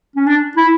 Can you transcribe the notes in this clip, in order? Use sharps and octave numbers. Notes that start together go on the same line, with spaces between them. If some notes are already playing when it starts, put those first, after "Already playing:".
C#4
D4
E4